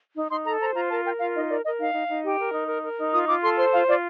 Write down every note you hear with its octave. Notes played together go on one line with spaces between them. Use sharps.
D#4
D#4 C6
A4 A#5
C5 A#5
F4 A#5
A#4 A5
A#4 G5
F4 F5
D#4 D#5
A#4 D5
A#4 D#5
D#4 F5
D#4
D#4
G4
A#4
D#4
A#4
A#4
D#4
F4 D#6
F4 D6
A4 C6
C5 C6
F4 F5
F4 D5